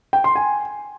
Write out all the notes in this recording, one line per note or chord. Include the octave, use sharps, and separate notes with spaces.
G5
C6
G#5